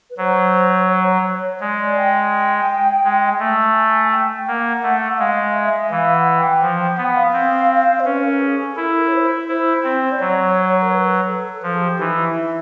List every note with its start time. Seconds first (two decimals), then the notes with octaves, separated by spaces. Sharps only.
0.10 B4
0.17 F#3 C5
0.89 C#5
1.60 G#3 D5
1.97 G5
3.04 G#3
3.40 A3
3.75 G#5
4.12 G5
4.47 A#3 F#5
4.83 A3
5.14 F#5
5.18 G#3 F5
5.54 E5
5.90 E3 F5
6.14 F#5
6.38 G5
6.62 F3
6.80 G5
6.98 B3 F#5
7.16 F5
7.33 C4
8.00 C5
8.05 C#4 B4
8.23 A#4
8.41 G#4
8.59 A4
8.76 E4 A#4
8.87 A4
8.97 A#4
9.08 C#5
9.13 C5
9.48 E4 C5
9.84 C4
10.12 D5
10.20 F#3 C#5
10.82 A#4
10.91 B4
11.28 A4
11.63 F3 A4
11.75 G#4
11.81 G4
11.99 E3 D#4
12.17 E4